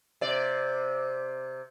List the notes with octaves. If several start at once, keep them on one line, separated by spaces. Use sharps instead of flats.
C3 D5